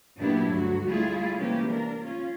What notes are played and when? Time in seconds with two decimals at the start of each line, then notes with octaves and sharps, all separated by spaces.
0.17 F#2 A#2 B3 D4 E4 G4
0.49 D2 G2 F#3 F#4
0.87 G3 A3 E4 F4 G#4
1.37 C3 E3 G#3 A#3 C#4 G4
1.69 D4 A#4
2.03 C#4 F4